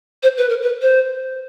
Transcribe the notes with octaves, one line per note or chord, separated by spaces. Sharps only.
C5
B4
A#4
B4
C5